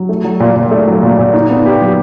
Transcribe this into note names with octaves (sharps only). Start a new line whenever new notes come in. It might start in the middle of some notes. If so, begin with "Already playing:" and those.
Already playing: F#3
A3
F#3
A#2
A#2
A3
F#3
A#2
A#2
D#4
B3
G4
F#3